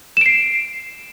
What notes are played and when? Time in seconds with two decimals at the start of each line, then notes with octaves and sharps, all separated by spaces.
0.17 E7
0.21 D7
0.26 C7